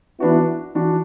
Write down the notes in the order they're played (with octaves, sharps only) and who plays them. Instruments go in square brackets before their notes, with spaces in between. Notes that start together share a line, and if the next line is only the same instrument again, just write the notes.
[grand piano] E3 D4 F#4 [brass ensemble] B3 E4
[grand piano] E3 D4 F#4